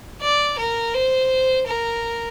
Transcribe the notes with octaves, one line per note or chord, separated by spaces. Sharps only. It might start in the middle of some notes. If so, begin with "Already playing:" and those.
D5
A#4
C5
A#4